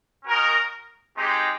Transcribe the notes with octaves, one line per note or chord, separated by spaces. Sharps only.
C#4 F#4 A#4 D#5
G#3 C4 D#4 G4